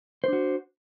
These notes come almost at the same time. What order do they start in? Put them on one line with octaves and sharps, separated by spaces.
C5 D4 F#4